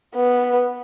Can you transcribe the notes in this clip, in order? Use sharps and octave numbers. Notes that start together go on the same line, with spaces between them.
B3